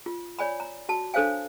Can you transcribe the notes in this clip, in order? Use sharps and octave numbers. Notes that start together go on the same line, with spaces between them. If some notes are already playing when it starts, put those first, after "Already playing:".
F4
C#5 D5 G#5 B5
A#5
F#4 A5
D4 A4 C5 C#5 F5 G#5